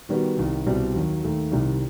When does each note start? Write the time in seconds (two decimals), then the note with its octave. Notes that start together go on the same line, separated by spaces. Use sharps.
0.09 D#3 G3 B3 F#4
0.37 C2 C3 D#3
0.66 C2 B2 G3 C4
0.95 D#2 D#3 F#3
1.24 D#2 D#3 A3
1.52 C2 C3 D#3 G3